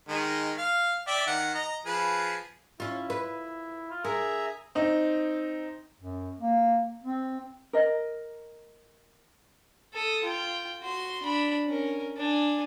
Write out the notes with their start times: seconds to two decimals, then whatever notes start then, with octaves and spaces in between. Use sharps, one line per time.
0.09 D#3 G#3
0.58 F5
1.07 D5 E5 G5
1.27 D#3 F#5
1.55 D#5 A#5
1.86 F3 G#4 B4
2.80 C#4 E4 F4
3.10 B4
3.90 F4
4.05 G#4 A#4 E5 A#5
4.75 C4 D#4
6.01 F#2
6.40 A#3
7.03 C4
7.73 A#4 D#5
9.94 A4 D#6
10.25 F4 G5
10.81 F#4 C6
11.23 D4 B5
11.67 C#4 A#4
12.17 D4 G#5